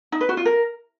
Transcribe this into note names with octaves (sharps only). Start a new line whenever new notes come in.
D#4
B4
F#4
F4
A#4